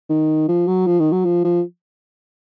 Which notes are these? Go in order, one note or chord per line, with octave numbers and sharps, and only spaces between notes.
D#3
F3
F#3
F3
D#3
F#3
F3
F3